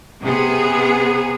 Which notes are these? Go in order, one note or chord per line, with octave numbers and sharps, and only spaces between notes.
C3 B3 G#4